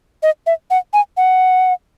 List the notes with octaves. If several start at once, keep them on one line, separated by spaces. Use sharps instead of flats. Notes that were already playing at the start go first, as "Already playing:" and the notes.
D#5
E5
F#5
G#5
F#5